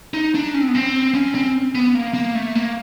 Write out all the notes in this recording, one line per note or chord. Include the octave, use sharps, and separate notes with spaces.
D#4
D4
C#4
C4
B3
C4
C#4
C4
B3
A#3
A#3
A3
A#3